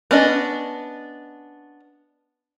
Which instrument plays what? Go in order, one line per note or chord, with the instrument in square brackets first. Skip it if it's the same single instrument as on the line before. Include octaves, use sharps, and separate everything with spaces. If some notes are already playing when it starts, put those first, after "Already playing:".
[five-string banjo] B3 C#4 D4 D#5